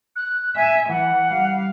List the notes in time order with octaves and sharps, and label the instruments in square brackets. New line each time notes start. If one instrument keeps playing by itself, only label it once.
[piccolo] F#6
[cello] E5 [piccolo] G#5
[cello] E3 [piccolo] F#5
[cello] G3 F5